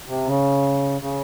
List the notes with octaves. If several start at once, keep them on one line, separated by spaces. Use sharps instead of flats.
C3
C#3
C#3